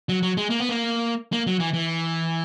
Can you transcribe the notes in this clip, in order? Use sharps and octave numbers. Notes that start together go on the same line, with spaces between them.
F#3
F#3
G#3
A#3
B3
A#3
A#3
F#3
E3
E3